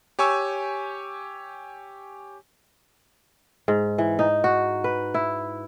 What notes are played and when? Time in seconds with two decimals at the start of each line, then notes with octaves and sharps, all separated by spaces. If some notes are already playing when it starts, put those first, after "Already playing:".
0.19 G4 C#5 G#5 C#6 E6
3.68 G#2
3.98 E3
4.19 D#4
4.44 F#4
4.84 B4
5.14 E4